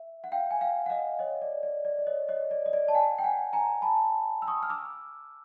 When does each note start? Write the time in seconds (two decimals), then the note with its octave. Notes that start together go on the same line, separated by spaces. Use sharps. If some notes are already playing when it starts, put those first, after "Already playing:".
Already playing: E5
0.24 F#5
0.32 F5 G5
0.51 G#5
0.61 F5 G5
0.86 F#5
0.90 D#5 F5
1.19 C#5 D#5
1.42 D5
1.63 D5
1.85 D5
1.98 D5
2.07 C#5 D#5
2.28 C#5 D#5
2.51 D5
2.66 D#5
2.73 D5
2.88 A5
2.94 F#5 G#5
3.19 G5
3.24 F#5 G#5
3.53 G#5 A#5
3.82 A5 B5
4.42 E6
4.47 C#6 D#6
4.63 F6
4.70 D6 E6